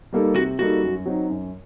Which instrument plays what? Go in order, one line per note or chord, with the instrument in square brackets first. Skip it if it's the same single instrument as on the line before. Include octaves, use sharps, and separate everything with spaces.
[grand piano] G3 A#3 D#4 A4
[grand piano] C3 [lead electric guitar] F#4
[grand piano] G3 A#3 D#4 A4 [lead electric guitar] F#4
[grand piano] F#2
F#3 C4 D#4
F#2